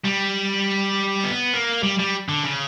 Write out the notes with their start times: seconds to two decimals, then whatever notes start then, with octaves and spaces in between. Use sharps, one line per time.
0.04 G3
1.24 B3
1.54 A#3
1.83 G3
1.99 G3
2.29 D3
2.44 C#3